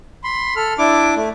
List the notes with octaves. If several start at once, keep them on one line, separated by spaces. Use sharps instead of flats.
B5 C6
A4 F6
D4 E4 D6
A3